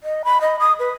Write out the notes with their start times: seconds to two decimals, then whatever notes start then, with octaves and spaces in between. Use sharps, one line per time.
0.04 D#5
0.25 B5
0.41 D#5
0.60 D#6
0.79 B4